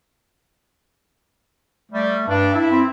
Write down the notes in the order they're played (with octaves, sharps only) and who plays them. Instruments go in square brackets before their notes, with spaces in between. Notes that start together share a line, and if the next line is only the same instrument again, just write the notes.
[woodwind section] G3 [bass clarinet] A3
[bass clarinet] G2 [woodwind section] D4
[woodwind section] E4 E5
[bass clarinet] C4